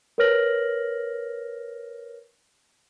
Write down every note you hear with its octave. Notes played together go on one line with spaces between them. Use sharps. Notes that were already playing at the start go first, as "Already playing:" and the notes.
A#4 B4 C#5 F6 A#6 F#7